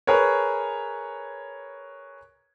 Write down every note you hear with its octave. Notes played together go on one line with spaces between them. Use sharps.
G#4 A#4 B4 C#5